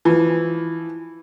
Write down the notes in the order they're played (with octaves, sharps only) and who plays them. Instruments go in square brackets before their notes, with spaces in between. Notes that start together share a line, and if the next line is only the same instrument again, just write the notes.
[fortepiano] E3 F3